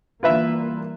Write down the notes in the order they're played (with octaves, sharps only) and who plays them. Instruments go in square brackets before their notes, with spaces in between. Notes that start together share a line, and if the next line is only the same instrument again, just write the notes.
[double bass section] E3 G3 A#3 [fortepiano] F4 B4 E5